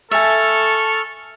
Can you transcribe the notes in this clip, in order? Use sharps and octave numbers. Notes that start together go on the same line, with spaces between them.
A4 E5 G#5 C#6 F6 A6